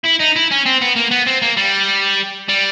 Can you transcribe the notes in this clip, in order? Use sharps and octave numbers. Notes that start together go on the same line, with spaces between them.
E4
D#4
E4
C#4
C4
B3
A#3
B3
C4
A#3
G3
G3